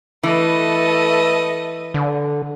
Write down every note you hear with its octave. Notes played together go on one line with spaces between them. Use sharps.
E3 A3 A4 B4 D#5
D3